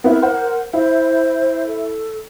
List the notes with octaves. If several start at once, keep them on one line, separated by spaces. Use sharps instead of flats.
B3 C4 E4 A#4
C5 F#5
E4 C5
A4